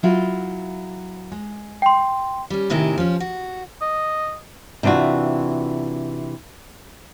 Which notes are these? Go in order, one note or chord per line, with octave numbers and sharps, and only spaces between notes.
F#3 E4 F4
G#3
G5 C6
G3 C#4
A2 C3 D#3 E4 G#4
F3 C#4
F#4
D#5
C3 E3 D4 F4 F#4